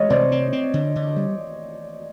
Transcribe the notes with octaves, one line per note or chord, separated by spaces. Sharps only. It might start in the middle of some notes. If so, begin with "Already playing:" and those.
Already playing: G#3 C#5 D#5
C3 C5 D5
C4
C4
D3
D3
G3